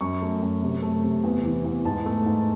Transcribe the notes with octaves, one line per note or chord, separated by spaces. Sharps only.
F#2 C#6
A3
F#2
C3
A3
C3
E2
E3
E2
G#2 A5
A3
G#2